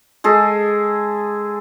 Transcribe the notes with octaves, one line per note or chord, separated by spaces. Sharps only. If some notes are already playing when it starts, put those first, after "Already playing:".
G#3 G#4 A4